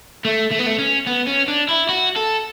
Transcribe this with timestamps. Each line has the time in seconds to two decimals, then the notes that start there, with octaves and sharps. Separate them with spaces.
0.25 A3
0.51 A3
0.59 B3
0.66 A3
0.79 C#4
1.06 B3
1.27 C#4
1.48 D4
1.69 E4
1.89 F#4
2.16 A4